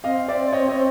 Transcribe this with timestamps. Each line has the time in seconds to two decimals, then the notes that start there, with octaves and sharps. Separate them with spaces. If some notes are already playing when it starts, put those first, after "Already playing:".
0.04 C4 D#5 F5
0.28 D5 E5
0.52 C#5 D#5
0.68 C#5 D#5